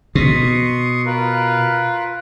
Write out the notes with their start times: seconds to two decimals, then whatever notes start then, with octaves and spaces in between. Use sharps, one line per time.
0.15 B2 C6 C#6 D#6
1.06 F4 A#4 B4